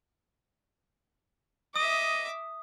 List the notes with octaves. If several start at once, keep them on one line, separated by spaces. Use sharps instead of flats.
D#5 E5 D6 D#6